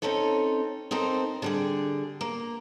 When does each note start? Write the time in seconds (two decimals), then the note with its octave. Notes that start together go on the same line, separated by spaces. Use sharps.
0.02 C4 C#4 D#4 A4 C#5
0.91 C4 D#4 A4 A#4 C5
1.42 D3 G3 G#4
2.21 A#3